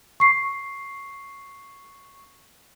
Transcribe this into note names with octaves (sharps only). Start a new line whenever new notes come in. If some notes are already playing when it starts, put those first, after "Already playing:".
C#6 C7